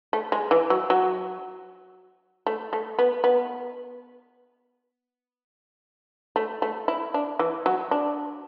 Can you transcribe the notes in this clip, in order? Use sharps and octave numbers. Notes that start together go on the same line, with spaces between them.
A3
G#3
E3
F#3
F#3
A3
A3
B3
B3
A3
A3
E4
D4
E3
F#3
D4